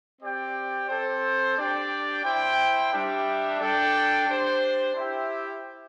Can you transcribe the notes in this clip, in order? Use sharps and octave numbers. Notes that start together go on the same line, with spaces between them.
C4 G4 D5 G5
C4 A4 C5
D4 G4 D5 G5
E4 C5 G5
G3 D4 G4 E5 G5
D4 A4 D5 G5
D4 G4 C5
E4 G4 C5 E5 G5